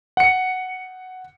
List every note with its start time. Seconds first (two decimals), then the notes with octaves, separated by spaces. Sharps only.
0.17 F#5 C#7